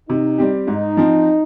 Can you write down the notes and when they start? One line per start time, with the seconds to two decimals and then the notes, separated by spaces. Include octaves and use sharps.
0.09 C3 D#4
0.38 G3 C4 G4
0.68 G#2 D#4
0.97 F3 C4